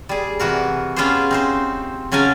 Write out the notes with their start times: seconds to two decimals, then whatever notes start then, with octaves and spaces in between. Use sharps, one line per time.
0.09 G3 G#4
0.39 C3 E3 F#4 A#4
0.96 B3 C#4 F4 G4 G#4 C5
1.31 C4 D#4 C5
2.12 C#3 F#3 C#4 A#4 G#5 A5